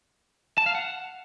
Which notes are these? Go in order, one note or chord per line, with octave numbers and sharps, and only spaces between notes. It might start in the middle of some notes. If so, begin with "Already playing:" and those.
A5
F5
F#5